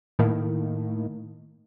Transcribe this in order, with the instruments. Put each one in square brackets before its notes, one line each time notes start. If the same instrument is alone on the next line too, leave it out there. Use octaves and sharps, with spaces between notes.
[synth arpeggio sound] A2 D#3 A#3